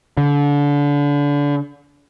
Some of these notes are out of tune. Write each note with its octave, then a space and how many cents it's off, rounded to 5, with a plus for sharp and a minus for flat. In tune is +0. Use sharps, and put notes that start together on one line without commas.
D3 -30